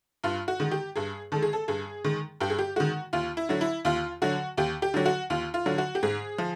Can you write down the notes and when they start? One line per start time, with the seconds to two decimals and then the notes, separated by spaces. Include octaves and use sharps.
0.24 G2 F4
0.48 F#4
0.60 D#3 G#3
0.71 G4
0.96 G2 G#4
1.32 D#3 G#3 A4
1.42 G#4
1.53 A4
1.68 G2 G#4
2.05 D#3 G#3
2.41 G2 G4
2.50 G#4
2.59 G4
2.76 D#3 G#3 F#4
3.13 D#2 F4
3.37 E4
3.49 D3 F#3
3.61 E4
3.85 D#2 F4
4.22 D3 F#3 F#4
4.57 D#2 G4
4.82 G4
4.94 D3 F#3
5.06 F#4
5.30 D#2 F4
5.54 F4
5.66 D3 F#3
5.78 F#4
5.95 G4
6.03 G#2 G#4
6.38 F3